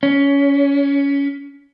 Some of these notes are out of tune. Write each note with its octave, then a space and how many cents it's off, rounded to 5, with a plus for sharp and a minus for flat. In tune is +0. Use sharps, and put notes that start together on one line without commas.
C#4 +20